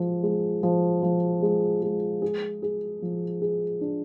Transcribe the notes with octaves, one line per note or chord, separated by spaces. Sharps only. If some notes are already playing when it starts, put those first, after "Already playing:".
Already playing: F3 G#3
G#3
F3
F3
G#3
G#3
G#4
G#4
F3
G#4
D4